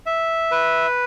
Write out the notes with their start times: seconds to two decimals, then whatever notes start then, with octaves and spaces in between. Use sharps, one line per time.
0.06 E5
0.51 B4